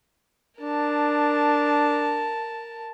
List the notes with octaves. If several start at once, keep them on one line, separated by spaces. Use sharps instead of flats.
D4 A#4 A5